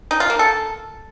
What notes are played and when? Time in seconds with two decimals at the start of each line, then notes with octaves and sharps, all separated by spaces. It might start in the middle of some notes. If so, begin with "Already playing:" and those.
0.11 D#4
0.20 F4
0.30 A#3
0.39 A4